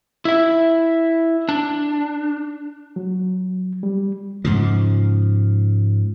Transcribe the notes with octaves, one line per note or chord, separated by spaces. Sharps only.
E4 E5
D4
F#3
G3
G#2 C#3 F3